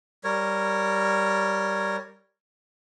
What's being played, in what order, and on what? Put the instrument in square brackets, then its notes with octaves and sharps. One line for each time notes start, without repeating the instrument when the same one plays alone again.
[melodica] G3 A#4 C#5